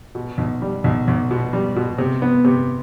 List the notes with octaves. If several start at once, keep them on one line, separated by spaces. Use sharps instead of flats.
B2
B1
G3
B1
B1
B2
G3
B2
C3
B3
C3